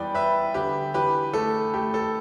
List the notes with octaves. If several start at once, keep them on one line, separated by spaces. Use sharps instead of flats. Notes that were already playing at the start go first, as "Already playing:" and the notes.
Already playing: E2 G3 B4 D5 G5
E2 B4 E5
D3 G4 B4
E3 G4 B4
A3 A4
A3 G4
A4